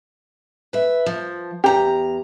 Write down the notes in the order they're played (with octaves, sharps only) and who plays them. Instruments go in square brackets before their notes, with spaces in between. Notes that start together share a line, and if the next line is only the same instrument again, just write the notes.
[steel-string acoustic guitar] B4 E5
F3
[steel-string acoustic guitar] E2 A#5 [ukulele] G4